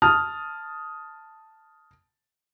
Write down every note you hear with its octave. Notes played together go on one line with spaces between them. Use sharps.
A5 D#6 F6